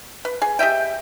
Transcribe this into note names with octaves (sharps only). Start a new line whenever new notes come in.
B4
G#4
G4 D#5 E5 G5